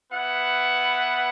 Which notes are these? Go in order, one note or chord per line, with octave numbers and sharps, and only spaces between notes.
B3 E4 B4 F#5